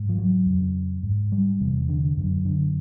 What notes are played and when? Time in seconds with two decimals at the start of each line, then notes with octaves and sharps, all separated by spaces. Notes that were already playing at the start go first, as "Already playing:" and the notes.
Already playing: G#2
0.09 F3
0.18 F#3
0.46 F2 C#3
1.03 G#2
1.32 G3
1.60 E2 C3
1.89 D3
2.17 F#2 D3
2.45 D3